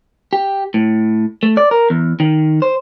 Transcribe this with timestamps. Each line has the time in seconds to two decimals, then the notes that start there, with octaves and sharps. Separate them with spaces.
0.33 G4
0.74 A2
1.43 A3
1.57 D5
1.71 A#4
1.90 E2
2.20 D#3
2.62 C5